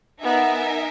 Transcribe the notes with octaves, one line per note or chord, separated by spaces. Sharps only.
B3 D#4 A#4 E5 G#5